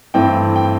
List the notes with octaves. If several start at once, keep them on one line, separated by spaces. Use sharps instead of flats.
G2 E3 A3 C4 G5
G5